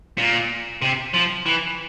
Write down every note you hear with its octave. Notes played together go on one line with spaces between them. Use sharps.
A#2
C3
F3
E3